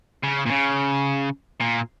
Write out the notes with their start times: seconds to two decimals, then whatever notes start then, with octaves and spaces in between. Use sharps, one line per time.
0.23 C#3
0.46 A#2
0.50 C#3
1.61 A#2